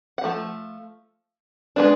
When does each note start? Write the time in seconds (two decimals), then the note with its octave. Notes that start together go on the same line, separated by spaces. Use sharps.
0.18 F#5
0.24 F3 A3
1.76 G#3 B3 D4